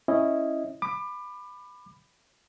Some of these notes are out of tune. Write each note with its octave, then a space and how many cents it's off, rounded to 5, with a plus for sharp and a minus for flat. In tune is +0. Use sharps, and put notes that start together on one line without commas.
C#4 -10 E4 +0 D#5 +0
B5 +10 D6 +30